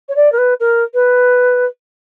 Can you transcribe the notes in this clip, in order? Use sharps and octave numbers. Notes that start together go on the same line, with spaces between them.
C#5
D5
A#4
B4
A#4
B4